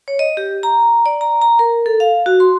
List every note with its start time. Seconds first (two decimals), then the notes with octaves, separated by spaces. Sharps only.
0.08 C#5
0.19 D#5
0.37 G4
0.63 A#5
1.06 D5
1.21 A#5
1.41 A#5
1.59 A#4
1.86 A4
2.00 F5
2.26 F#4
2.40 C6